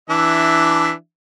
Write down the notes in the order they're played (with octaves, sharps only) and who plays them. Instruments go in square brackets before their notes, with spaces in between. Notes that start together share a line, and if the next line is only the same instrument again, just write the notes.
[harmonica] E3 D4 E5